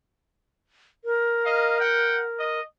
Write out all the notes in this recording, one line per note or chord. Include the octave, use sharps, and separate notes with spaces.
A#4
D#5 F5
F#5 G5
D#5